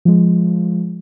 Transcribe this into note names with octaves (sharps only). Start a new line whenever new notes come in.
F3 G#3